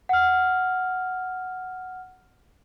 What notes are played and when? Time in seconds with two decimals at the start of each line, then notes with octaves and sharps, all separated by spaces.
0.09 F#5 F6